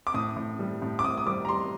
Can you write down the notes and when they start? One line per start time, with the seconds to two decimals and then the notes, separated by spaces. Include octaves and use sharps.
0.07 D6
0.14 A2 D#6
0.36 A2
0.59 G3
0.82 A2
0.99 D6
1.04 A2 D#6
1.17 D#6
1.26 G3 D6
1.45 A#5
1.49 G3 C6